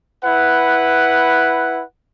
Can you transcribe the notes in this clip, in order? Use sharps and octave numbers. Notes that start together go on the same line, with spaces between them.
E4 B4 F#5